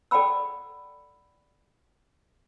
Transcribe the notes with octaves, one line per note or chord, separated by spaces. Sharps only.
A4 D5 F#5 G5 B5 E6